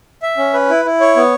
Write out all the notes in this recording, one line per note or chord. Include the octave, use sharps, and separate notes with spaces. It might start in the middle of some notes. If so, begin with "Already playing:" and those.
E5
C#4
B4
E4
E4
C#5
B3